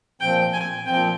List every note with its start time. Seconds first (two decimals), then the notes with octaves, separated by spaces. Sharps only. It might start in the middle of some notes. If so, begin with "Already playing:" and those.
0.21 A#2 F3 C4 G5
0.53 G#5
0.85 A#2 F3 C4 G5